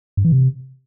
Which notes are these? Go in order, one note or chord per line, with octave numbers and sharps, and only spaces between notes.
G2
E3
C3